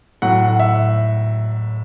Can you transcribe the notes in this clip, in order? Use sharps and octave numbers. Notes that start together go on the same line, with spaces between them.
A2 F#3 F#5
F#5
E5